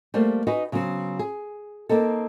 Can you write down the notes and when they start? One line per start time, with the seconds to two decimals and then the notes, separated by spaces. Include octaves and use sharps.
0.14 G3 A3 A#3 C5
0.47 D#4 F#4 B4 G#5
0.72 C#3 F#3 B3 C4
1.19 G#4
1.89 A#3 C4 D#4 A4